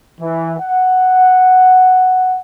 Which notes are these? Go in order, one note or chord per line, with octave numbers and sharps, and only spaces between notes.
E3
F#5